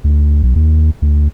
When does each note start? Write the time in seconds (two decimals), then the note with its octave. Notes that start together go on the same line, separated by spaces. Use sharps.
0.04 D2
0.43 B1
0.56 D#2
1.02 D2